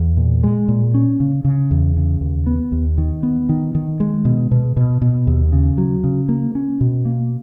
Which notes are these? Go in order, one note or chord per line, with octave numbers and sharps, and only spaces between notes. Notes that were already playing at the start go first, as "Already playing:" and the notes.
Already playing: E2
A#2
G#3
A#2
C#4
C#3
C#3
E2
C#3
D#2
B3
D#2
D#3
B3
D#3
D#3
G#3
B2
B2
B2
B2
D#2
C#3
F#3
C#3
A#3
C#4
B2
A#3